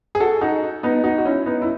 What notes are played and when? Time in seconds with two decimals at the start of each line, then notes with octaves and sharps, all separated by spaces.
0.15 G#4
0.20 F#4 A4
0.41 D#4 F#4
0.83 B3 D#4
1.04 D#4 F#4
1.18 F#4
1.25 C#4 E4
1.46 B3 D#4
1.62 E4